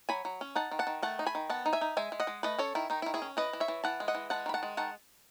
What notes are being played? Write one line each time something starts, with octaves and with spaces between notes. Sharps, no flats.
F#3 G#5 B5
F#3
C#4
D#4 F#5 A5
D#3
F#5 A5
D#3
A3 F#5 A5
D#4
G#5 B5
D#3
B3 F#5 A5
D#4
E5 G#5
D#4
G#3 E5 G#5
G#3
D#5 F#5
G#3
A3 B4 D#5
C#4 A4 C#5
D#3 E4
D#3 D#4
E4
D#3
E4 G#4
C#4
E3 B4 D#5
E3
C#5 E5
E3
E3 F#5 A5
G#3
D#5 F#5
E3
G#3 F#5 A5
D#3 B5
F#5 A5
G#3
D#3 F#5 A5